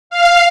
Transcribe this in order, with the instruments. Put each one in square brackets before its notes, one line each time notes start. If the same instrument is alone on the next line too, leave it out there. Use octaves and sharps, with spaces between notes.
[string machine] F5